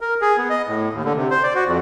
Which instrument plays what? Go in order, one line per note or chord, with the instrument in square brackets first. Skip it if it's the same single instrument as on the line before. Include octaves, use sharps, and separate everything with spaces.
[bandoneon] A#4
G#4
B3
D#5
A2
D#2
D3
C3
C5
D5
F#4
F2